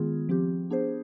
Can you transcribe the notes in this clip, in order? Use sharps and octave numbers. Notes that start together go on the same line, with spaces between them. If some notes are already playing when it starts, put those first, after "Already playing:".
Already playing: D#3 G#3 B3 F4 G#4
F3 C4 G4
B3 D4 G#4 C5